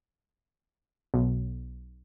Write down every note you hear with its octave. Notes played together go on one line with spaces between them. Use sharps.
B1